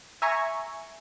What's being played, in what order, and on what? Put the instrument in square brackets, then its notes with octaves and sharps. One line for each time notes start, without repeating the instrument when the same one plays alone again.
[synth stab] E5 G#5 A#5 C#6